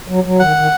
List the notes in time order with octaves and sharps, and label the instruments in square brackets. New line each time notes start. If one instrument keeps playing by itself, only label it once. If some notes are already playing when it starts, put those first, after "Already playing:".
[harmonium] F#3
F#3
[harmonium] D#3 [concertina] F#5
[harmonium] D#3